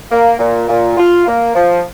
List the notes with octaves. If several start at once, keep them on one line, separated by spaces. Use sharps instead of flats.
A#3
A#2
A#2
F4
A#3
F3